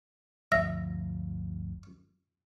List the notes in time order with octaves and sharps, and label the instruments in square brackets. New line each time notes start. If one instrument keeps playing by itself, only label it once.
[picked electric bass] G1 D2 F3 [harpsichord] E5 [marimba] A#6